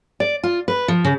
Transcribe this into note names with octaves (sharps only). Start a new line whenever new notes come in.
D5
F4
B4
F3
C#3